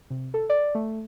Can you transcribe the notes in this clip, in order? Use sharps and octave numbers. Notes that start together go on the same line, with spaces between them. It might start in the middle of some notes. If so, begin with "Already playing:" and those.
C3
A4
D5
A3